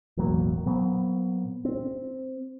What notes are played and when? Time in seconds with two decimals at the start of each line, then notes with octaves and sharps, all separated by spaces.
0.17 E1 A1 F#3 A#3
0.66 A#2 F#3 B3 C4
1.65 C4